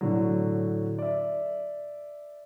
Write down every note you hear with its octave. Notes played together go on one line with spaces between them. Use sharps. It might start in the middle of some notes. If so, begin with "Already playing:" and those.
A2 D3 F#3
D5 E5